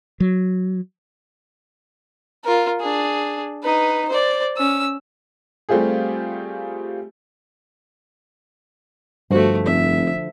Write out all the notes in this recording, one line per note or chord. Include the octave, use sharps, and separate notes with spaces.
F#3
F4 A#4
D4 G#4
D#4 B4
C5 D5
C#4 E6
G3 A3 C4 F4 G4 G#4
G2 D3 F3 A3 F#4 C5
F1 E5